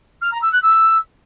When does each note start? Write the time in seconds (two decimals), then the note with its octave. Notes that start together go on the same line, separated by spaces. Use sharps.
0.21 F6
0.31 A#5
0.42 E6
0.52 F#6
0.62 E6